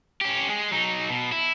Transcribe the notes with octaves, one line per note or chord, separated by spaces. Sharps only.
C#4 G4
G#3 G#4
F#3 D#4
B2
E4